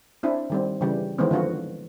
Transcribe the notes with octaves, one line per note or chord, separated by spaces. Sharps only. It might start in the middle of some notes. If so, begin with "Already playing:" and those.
C4 D4 E4
D#3 G3 C4
C#3 E3 G3 G4
D#3 E3 G#3 B3 C4
D3 F3 F4 F#4